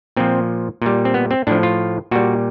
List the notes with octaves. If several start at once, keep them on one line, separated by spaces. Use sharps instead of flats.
A#2 F3 C4
A#2 G3
C4
B3
C4
A2 F3 D4
F4
A#2 G3 F#4